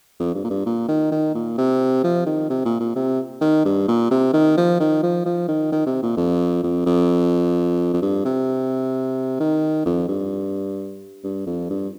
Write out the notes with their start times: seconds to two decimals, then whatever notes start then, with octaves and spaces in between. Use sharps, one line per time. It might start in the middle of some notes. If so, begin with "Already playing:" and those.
0.20 F2
0.34 G2
0.44 A#2
0.50 G2
0.66 A#2
0.88 D#3
1.11 D#3
1.35 A#2
1.58 C3
2.04 F3
2.26 D#3
2.50 C3
2.65 A#2
2.80 A#2
2.96 C3
3.41 D#3
3.65 G2
3.88 A#2
4.11 C3
4.33 D#3
4.57 F3
4.80 D#3
5.03 F3
5.26 F3
5.48 D#3
5.72 D#3
5.86 C3
6.03 A#2
6.17 F2
6.63 F2
6.86 F2
7.93 F2
8.02 G2
8.25 C3
9.40 D#3
9.86 F2
10.08 G2
11.24 G2
11.47 F2
11.70 G2